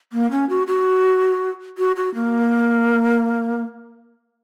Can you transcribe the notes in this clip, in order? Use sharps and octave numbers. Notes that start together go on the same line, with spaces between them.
A#3
C#4
F#4
F#4
F#4
F#4
A#3